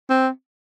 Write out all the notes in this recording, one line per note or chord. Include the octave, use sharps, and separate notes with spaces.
C4